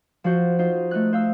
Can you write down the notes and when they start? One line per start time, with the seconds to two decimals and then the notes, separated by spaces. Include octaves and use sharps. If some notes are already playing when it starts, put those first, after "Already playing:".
0.24 F3 F4 F#4 C5
0.58 D#4 F4 C5
0.91 A3 D#4 F#6
1.13 C5 F5 E6